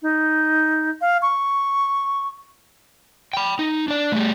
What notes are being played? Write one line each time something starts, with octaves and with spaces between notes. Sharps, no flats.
D#4
F5
C#6
G5 B5
D#4
D4 D5
G3 A3